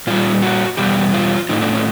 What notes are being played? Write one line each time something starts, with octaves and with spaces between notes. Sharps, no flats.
A#2 G3 F4
F#4
E2 B2 G3 G4
F4
A2 F3 A3 D#4
D4
C#4